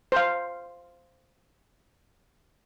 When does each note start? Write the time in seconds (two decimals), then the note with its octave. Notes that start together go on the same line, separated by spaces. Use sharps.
0.12 C5 F5